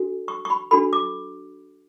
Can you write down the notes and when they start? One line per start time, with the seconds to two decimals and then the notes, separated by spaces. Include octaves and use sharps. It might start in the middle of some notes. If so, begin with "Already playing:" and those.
Already playing: D4 F#4 A4
0.28 C#6
0.45 C#6
0.50 B5
0.71 D4 F#4 A4 B5
0.93 D6